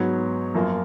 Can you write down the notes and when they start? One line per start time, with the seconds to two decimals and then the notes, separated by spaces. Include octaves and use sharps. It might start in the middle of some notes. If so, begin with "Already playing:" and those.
Already playing: G#2 F#3 B3 F#4 C#5
0.54 F#2 F3 A#3 F4